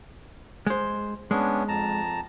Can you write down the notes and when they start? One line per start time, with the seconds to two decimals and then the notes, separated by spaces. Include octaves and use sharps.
0.66 G#3 C5
1.31 G#3 B3 C#4 D4
1.68 F2 A5 A#5